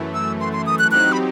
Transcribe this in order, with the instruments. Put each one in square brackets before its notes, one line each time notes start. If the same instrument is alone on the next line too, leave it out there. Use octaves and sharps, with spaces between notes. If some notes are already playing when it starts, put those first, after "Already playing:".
Already playing: [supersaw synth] F#2 E3 A3
[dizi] E6
C6
C6
D#6
F#6
[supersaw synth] F#3 C4 D#4 G4 [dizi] F#6
[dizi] B5